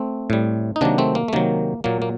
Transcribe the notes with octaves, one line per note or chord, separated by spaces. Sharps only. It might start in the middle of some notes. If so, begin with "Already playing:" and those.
Already playing: A3 C4
A2 G3
D#4
C3 D#3 F#3 A#3 D4
A3 C4
A#3
A3
C3 D#3 F#3 A#3
A#2 F#3 A#3
A#3